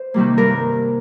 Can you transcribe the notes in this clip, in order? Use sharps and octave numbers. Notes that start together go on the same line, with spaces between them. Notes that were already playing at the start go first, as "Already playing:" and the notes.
Already playing: C5
C3 D#3 G3 A#3
G2 A#4